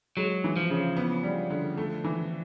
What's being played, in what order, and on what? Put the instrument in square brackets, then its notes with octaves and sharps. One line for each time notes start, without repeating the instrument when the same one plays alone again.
[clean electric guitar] F#3 [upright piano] G#3
[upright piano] E3
[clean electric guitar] F3
[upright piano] C#3
B3
G3
D3
A3
E3